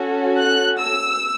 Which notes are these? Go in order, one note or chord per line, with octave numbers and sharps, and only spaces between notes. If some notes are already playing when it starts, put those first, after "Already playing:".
Already playing: C#4 F#4 A4
F#6
E6